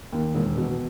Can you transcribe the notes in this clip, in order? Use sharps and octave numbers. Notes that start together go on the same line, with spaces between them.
D#2
E1
B2